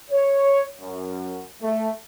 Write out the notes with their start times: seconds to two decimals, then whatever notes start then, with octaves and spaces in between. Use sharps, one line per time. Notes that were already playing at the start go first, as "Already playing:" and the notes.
0.11 C#5
0.80 F#2
1.61 A3